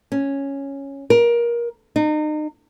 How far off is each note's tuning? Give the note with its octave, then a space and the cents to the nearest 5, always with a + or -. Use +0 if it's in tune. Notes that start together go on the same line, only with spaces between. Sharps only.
C#4 -5
A#4 +20
D#4 -35